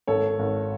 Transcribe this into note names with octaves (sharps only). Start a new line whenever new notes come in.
G#1 A4 C#5
G#1